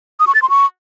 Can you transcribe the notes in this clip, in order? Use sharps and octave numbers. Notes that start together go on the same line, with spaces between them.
D#6
C#6
A6
C6
C#6